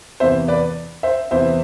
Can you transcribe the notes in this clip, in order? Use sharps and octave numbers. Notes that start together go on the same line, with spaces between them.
E2 C3 E3 C5 E5
B4 D5
C5 E5
E2 C3 E3 C5 E5